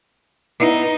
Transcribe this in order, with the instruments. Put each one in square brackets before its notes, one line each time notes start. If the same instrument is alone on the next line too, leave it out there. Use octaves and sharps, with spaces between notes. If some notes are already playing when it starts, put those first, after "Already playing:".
[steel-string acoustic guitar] B3 E4 [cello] D#4